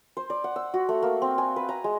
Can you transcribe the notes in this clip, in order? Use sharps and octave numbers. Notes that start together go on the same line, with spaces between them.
C5
D5
F#5
E6
F#4
A3
A#3
C4
G#5
B4
A#5
G#3